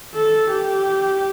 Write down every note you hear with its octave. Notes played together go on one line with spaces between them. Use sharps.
A4
G4